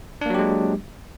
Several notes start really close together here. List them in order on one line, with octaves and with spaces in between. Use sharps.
D4 A#3 F#3 G4 G#3